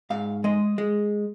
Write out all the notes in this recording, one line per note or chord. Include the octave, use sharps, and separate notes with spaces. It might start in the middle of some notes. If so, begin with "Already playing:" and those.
G#2 F5
G#3 D#5
G#3